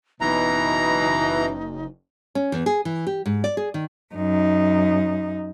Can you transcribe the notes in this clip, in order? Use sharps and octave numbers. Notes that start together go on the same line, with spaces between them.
F#1 B2 E3 D#4 A#5
C#4
E2
G#4
E3
G4
G#2
D5
G#4
D#3
F#2 D#4